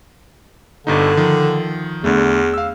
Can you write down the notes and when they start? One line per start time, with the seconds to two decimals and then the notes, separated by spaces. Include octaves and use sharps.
0.87 G1 G2 D3 D#4
1.17 D#3 F3
2.04 E2 D3 A3
2.54 F5 E6